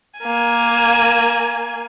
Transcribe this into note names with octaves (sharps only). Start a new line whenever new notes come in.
A#3 G#5